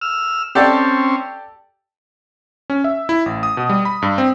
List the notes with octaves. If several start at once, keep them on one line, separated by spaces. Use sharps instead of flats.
E6 F6
C4 C#4 G4 A4 D5
C#4
E5
E4
A1
D#6
B2
G3
B5
G2
C4